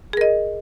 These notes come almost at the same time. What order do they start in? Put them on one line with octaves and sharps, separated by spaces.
G#4 A#4 D#5